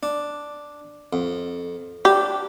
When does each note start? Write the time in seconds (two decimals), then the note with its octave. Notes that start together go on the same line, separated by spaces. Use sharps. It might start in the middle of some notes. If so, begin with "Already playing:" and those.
0.03 D4
1.13 F2
2.05 D4 G4